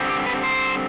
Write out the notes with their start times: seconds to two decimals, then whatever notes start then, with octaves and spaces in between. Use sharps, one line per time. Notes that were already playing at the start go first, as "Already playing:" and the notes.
Already playing: D3 G3 C4
0.09 G4
0.26 B4
0.44 C5